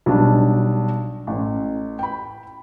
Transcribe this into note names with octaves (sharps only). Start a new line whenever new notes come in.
B1 G3 D4
A1
G5 B5